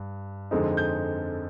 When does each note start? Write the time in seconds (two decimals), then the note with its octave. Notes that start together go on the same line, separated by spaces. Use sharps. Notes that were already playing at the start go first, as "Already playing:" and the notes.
Already playing: G2
0.51 F2 D3 G#3 C4 D#4
0.77 G6